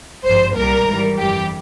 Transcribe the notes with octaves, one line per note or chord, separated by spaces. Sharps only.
G#1 G2 F3 C5
C2 A#2 G3 A#4
G#1 G#2 E3 G3
G1 F2 E3 G3 G4